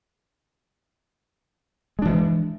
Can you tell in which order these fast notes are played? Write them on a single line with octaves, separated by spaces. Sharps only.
G#3 D4 E3